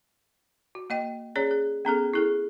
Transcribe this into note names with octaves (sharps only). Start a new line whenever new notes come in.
F#4
A#3 D#5 G5
C#4 G#4 C#5 D5
G#4
B3 C#4 G#4 A4
E4 G#4 A4